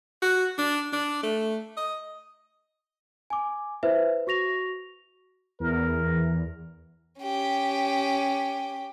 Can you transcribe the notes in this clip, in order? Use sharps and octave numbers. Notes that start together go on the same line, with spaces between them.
F#4
D4
D4
A3
D#5
G#5 D6
E4 B4 C5 E5
F#4 C#6 A#6 F7
E2 A#4
C#4 G4